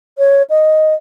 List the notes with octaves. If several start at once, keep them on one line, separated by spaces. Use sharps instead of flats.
C#5
D#5